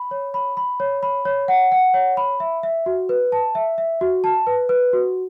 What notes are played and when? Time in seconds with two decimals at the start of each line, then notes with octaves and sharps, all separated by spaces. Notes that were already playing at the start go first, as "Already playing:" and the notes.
Already playing: B5
0.11 C#5
0.34 B5
0.57 B5
0.80 C#5
1.03 B5
1.25 C#5
1.48 F#5
1.72 F#5
1.94 C#5
2.17 B5
2.40 E5
2.63 E5
2.86 F#4
3.09 B4
3.32 A5
3.55 E5
3.78 E5
4.01 F#4
4.24 A5
4.47 B4
4.69 B4
4.93 F#4